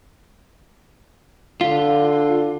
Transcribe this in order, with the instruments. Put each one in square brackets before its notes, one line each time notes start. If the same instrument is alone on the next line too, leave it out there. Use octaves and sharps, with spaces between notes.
[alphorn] D3 [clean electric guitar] F4 [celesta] F5